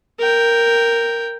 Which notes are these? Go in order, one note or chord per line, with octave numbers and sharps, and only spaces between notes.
A#4 G5